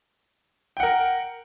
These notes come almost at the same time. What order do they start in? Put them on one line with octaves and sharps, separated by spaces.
G5 F#5 A#4